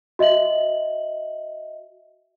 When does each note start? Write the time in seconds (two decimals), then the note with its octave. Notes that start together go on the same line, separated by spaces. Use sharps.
0.19 F#4 D#5 E5 F#7